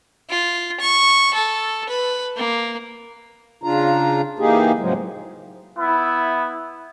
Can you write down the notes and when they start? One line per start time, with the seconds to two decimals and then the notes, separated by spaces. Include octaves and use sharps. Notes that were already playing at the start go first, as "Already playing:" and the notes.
0.30 F4
0.80 C#6
1.34 A4
1.89 B4
2.37 A#3
3.63 C#3 D4 F4 A#5
4.39 E3 A#3 D#4 G4 G#4
4.79 A2 C#3 F3 F#3 G#3
5.78 B3 E4